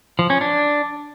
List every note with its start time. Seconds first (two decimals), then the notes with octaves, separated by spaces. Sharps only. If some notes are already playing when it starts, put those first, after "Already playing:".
0.19 F3
0.30 C#4
0.41 D4